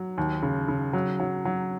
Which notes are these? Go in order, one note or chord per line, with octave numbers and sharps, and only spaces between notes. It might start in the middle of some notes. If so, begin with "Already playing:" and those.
Already playing: F#3
D#2
C#3
C#3
F#3
F#3
F#3